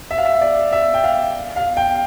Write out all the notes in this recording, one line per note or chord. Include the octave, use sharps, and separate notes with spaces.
E5
F5
E5
D5
E5
G5
F5
F5
G5